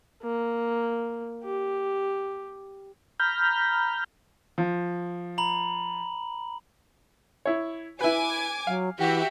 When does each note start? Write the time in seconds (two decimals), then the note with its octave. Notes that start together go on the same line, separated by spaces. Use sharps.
0.23 A#3
1.44 G4
3.20 A#5 B5 F6 G6
4.58 F3
5.38 A#5 B5 F#7
7.45 E4 C#5
8.01 E4 B4 G#5 D6
8.67 F#3 F5
8.99 E3 F#4 G4 E5